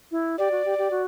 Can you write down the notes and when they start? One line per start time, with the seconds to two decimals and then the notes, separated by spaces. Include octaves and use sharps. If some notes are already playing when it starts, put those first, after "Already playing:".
0.11 E4
0.38 G4 D5
0.51 F#4
0.65 G4
0.78 G4
0.91 F#4